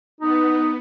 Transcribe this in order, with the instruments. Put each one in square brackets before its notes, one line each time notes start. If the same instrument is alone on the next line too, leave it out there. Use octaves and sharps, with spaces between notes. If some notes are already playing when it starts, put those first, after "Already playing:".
[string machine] B3 [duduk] D#4